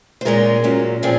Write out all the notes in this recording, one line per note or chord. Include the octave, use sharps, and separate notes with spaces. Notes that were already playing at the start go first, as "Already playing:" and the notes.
C5
A#2 G#3 C#4 F4 A#4
A#2 F#3 C#4
A#2 F3 C4 G#4